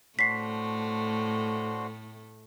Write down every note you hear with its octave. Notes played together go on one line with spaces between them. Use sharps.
A2 A3 D4 F#4 C5 B6 C7